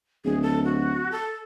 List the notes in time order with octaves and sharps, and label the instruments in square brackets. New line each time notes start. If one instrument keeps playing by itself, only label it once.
[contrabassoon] D1 [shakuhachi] G#4
[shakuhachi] A4
F#4
A4